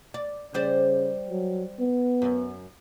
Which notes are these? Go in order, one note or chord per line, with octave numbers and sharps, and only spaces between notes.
D5
C#3 G3 C5 D5
F#3
B3
F#2